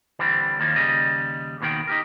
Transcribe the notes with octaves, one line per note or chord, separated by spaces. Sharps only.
D3 E3 G3 C4
D#2 D#3 F3 A#3
D#2 C#3 G3 D#5
D#2 B2 D#3 G4 G5
D#4 G4 A#4